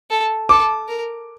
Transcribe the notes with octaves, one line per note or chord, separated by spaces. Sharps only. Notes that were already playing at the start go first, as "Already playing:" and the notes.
A4
A4 D6
A#4